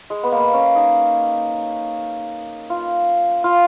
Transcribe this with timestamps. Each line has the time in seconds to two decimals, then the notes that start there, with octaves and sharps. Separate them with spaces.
0.10 G#3
0.23 B3
0.32 A#3
0.54 C#4
0.75 D#4
2.70 F4
3.44 F4